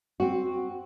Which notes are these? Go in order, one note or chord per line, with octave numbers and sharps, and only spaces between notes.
C4 F#4